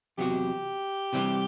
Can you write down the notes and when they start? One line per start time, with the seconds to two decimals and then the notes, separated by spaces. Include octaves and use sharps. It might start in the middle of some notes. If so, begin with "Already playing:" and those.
0.18 E2 C3 F#3 B3 F#4 G4
1.13 C3 E3 G3 C4